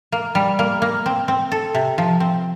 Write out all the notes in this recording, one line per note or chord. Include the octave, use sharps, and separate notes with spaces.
A#3
G3
A#3
A#3
C4
C4
A4
C3
F3
C4